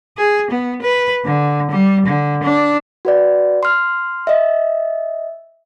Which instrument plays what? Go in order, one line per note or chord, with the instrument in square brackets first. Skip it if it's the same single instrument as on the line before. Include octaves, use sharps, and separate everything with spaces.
[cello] G#4
B3
B4
D3
G3
D3
D4
[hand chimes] F#4 B4 D5
C6 F6
D#5 E5